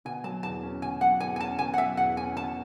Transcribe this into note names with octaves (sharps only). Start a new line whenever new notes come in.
B2 G#5
F#3 A5
E2 A5
C#4
B2 G#5
F#3 F#5
E2 G#5
G#5
C#4 A5
B2 G#5
F#5
F#3 E5
E2 F#5
C#4 G#5
B2 A5